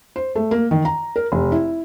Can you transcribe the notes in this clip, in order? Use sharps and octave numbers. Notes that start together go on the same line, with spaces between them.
C5
A3
A#3
D#3
A#5
A#4
F1
E4